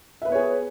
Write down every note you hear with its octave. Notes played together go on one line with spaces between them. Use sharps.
B3 G#4 B4 C#5 E5